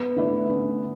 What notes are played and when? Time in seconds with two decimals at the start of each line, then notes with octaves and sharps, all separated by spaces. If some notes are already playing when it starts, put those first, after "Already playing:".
Already playing: B3
0.16 D3 A3 E4 B4 D5
0.49 D3 A3 C#4